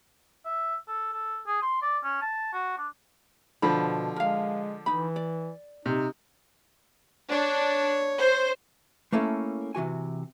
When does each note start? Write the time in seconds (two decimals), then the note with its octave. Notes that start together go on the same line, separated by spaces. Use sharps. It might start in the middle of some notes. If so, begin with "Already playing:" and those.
0.45 E5
0.88 A4
1.13 A4
1.47 G#4
1.62 C6
1.82 D5
2.03 C#4
2.22 A5
2.53 F#4
2.78 D4
3.62 B2 D3 F3 C5 B5
4.16 G#3 A#4 F5
4.86 E3 D#4 B5
5.16 D5
5.86 C3 D#4
7.31 D4 C#5
8.18 C5
9.12 A3 A#3 C#4 E4 A4
9.75 C3 E3 F#4 G#5